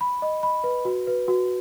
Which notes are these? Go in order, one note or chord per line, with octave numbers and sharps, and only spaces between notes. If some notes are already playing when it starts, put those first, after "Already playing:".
B5
D#5
B5
B4
F#4
B4
F#4